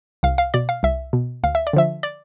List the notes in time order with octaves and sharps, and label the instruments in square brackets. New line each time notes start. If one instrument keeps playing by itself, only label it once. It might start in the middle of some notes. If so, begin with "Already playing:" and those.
[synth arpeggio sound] C2 F5
F5
B2 D5
F5
C2 E5
B2
D2 F5
E5
D5
D3 F3 E5
D5